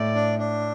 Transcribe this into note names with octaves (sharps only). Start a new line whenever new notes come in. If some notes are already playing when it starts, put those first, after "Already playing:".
Already playing: A2 D5
D4
D4